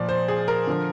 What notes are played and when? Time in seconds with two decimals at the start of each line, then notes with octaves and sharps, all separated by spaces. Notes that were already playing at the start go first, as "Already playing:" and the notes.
Already playing: A#2 F3 D5
0.09 C5
0.28 G#4
0.48 A#4
0.67 D3 F3